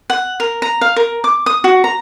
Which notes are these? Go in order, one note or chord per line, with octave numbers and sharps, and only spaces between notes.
F#5
A#4
A#5
F5
A#4
D6
D#6
F#4
A#5